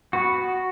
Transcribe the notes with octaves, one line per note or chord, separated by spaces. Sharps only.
B3 F#4